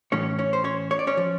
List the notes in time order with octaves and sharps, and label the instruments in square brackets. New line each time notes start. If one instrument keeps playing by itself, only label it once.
[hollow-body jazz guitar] A2 E3 C#4 C#5
C#4 C#5
C5
C#4 C#5
C#5
D5
C#4 C#5
F3